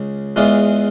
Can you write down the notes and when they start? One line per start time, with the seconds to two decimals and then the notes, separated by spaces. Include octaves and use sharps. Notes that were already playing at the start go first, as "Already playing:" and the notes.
Already playing: C#2 C#3
0.36 E2 E3 G#3 F4